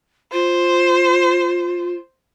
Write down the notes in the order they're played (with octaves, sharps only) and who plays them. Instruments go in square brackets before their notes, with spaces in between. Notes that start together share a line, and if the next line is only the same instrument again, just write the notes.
[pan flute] F4 [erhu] C5